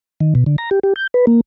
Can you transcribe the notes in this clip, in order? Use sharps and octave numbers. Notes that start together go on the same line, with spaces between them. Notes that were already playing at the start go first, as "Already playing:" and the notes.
D#3
B2
D3
A#5
G4
G4
G6
B4
A#3